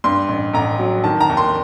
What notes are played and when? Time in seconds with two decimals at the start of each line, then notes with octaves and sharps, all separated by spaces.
0.04 G2 C6
0.29 A1
0.54 A1 A#5
0.79 F#3
1.04 D#3 A5
1.21 A#5
1.30 D#2
1.37 C6